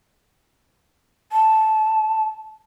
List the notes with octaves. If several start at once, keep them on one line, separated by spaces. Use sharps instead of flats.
A5